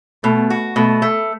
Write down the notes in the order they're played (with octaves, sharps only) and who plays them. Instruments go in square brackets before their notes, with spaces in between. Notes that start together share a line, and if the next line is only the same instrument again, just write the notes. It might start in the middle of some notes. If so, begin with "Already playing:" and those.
[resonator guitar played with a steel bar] B2 [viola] A3
[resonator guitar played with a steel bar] F#4
[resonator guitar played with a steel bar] B2 [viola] A3
[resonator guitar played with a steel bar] A3